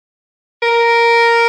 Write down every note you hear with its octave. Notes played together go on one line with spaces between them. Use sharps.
A#4